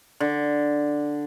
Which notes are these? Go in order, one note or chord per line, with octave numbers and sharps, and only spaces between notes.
D3